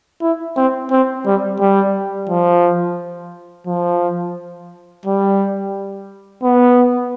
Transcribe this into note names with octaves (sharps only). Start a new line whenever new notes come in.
E4
C4
C4
G3
G3
F3
F3
G3
B3